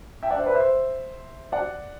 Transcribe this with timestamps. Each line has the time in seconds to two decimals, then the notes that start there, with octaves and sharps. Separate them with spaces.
0.23 E5 G5
0.30 D5 F#5
0.38 C5 E5
0.46 B4 D5
0.55 C5 E5
1.52 D5 F#5